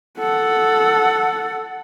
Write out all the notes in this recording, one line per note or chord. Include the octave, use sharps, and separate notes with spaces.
A4 F#5